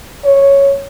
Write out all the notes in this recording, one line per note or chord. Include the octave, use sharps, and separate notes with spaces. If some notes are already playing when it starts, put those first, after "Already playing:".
C#5